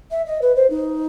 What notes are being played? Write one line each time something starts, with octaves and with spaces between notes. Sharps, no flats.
E5
D#5
B4
C5
D#4